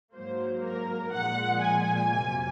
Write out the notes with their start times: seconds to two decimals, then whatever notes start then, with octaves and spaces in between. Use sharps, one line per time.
0.13 G#2 F#3 A#3 C5
0.63 A#4
1.12 A#2 F3 G#3 F#5
1.62 G#5
2.11 F2 C3 F#3 A#3